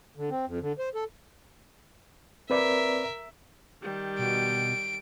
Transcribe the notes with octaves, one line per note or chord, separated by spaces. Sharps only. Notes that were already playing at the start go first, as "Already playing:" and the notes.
D3
C4
F2
D3
C5
A4
C4 A#4 B4 D5 E5
D#3 G3
B2 D7